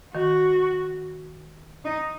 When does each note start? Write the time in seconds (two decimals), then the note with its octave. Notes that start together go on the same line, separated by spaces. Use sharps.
0.14 D#3 F#4
1.85 D#4